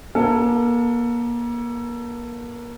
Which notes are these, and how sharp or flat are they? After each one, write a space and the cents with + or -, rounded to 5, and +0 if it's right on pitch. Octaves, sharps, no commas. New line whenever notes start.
A#3 +35 A4 +20